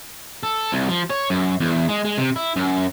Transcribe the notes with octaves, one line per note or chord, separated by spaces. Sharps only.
A4
C2
F3
C#5
F#2
E2
G#3
G#3
C3
E4
F#2